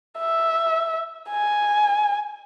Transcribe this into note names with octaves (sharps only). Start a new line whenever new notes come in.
E5
G#5